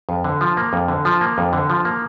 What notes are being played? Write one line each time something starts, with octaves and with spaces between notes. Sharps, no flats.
F2
D3
F3
A#3
F2
D3
F3
A#3
F2
D3
F3
A#3